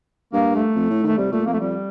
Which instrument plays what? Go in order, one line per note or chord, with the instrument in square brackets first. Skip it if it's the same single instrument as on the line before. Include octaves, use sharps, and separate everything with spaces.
[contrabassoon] G2 [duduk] A#3
[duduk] A3
[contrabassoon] F2
A2
[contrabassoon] D#3 [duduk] A3
[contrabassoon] C3 [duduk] G3
[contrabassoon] A#2 [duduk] A3
[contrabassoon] F2 [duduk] A#3
[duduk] A3
[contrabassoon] F2 [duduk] G3